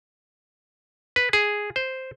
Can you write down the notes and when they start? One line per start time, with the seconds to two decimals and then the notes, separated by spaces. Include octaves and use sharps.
1.16 B4
1.33 G#4
1.76 C5